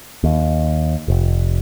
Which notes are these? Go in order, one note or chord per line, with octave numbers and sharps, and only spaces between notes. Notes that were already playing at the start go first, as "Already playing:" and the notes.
D#2
F1